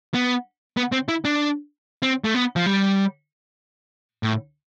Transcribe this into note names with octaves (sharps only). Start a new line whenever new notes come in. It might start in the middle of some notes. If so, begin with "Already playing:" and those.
B3
B3
C4
E4
D4
C4
A3
B3
F3
G3
A2